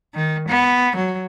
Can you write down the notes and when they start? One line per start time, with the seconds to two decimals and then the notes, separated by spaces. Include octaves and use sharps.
0.14 D#3
0.48 B3
0.96 F#3